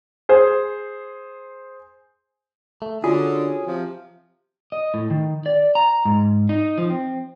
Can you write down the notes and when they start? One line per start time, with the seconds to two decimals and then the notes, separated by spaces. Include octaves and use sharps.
0.29 G#4 C5
2.82 A3
3.04 D3 C#4 F4 F#4 G#4
3.67 C3 F3
4.72 D#5
4.94 A2
5.11 D#3
5.46 D5
5.75 A#5
6.05 G#2
6.49 D#4
6.78 F3
6.90 C4